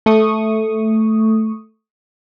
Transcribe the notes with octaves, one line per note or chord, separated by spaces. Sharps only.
A3 C#6 D#6